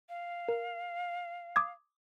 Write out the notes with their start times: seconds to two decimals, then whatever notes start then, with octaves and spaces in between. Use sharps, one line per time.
0.09 F5
0.48 A#4
1.56 D6 D#6 G#6